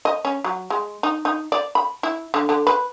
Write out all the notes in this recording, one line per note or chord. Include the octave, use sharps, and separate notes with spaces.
D#5
C#4
F#3
G#3
D#4
D#4
D5
B5
E4
D3
D3
B4